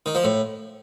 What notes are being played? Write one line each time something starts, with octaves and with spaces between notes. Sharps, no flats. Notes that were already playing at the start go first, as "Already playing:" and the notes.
D#3
F3
A2